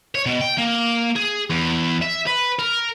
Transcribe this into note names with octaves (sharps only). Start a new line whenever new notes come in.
C#5
B2
G5
A#3
G#4
E2
E5
B4
A#4